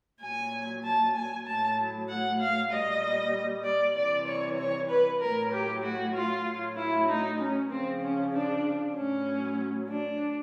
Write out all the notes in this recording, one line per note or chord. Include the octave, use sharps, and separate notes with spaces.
A#2 F#3 G#5
A5
G#5
A2 F#3 A5
F#5
F5
A#2 G3 D#5
D5
C3 E3 G3 D5
C#5
C#5
B4
A2 F#3 A#4
G4
F#4
F4
A2 F#3
E4
D#4
C#4
C#3 F3 C4
C#4
D4
A2 F#3 C#4
D4